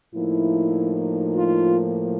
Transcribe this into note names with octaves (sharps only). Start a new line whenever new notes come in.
A2 F3 A#3 D#4 E4
F4